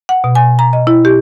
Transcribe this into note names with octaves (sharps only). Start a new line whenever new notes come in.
F#5
B2
G#5
A#5
D#5
E4
G4